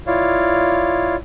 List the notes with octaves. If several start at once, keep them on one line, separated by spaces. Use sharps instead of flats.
E4 F4 C#5 D5 F5